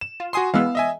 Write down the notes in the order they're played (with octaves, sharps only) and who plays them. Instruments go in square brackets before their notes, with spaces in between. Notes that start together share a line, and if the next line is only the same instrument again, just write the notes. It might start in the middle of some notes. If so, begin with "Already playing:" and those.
[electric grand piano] E7
[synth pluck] F4
[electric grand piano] F#4 G#5 C6 [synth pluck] D#6 C7
[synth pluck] E3 G#3 B3 [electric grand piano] F5 E6
[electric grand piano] D#5 E5 G#5